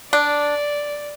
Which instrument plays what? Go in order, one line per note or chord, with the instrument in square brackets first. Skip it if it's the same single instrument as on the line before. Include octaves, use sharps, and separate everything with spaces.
[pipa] D4 [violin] D5